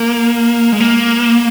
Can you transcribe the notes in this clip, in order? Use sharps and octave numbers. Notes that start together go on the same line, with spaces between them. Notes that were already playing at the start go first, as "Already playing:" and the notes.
Already playing: A#3
G#3
A#3